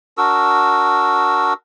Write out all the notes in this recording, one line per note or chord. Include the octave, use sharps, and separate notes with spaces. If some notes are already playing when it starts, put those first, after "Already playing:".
D4 F#4 A#4 E6